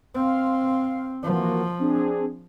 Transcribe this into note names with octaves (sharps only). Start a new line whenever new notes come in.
C4 F5 C6
E3 F3 A#3 F#4
C4 D4 G#4